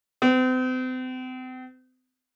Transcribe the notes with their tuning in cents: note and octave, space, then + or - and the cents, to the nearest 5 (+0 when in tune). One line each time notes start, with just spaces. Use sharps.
C4 -40